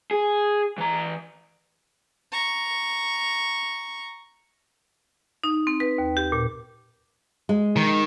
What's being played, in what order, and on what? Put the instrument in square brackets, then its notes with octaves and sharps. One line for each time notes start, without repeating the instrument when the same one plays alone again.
[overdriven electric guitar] G#4
E3 A#5
[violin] A#5 C#6
[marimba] D#4
C4
B4
D#2
G4
A#2
[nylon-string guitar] G#3
[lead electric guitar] D#3